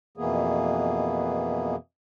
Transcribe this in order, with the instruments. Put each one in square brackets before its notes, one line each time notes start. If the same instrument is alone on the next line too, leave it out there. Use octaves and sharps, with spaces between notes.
[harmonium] F2 B2 E3 A#3 B3 G#4